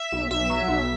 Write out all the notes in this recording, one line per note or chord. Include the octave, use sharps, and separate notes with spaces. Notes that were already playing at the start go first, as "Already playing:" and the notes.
Already playing: E5
B1
B1 E5
F#3
B1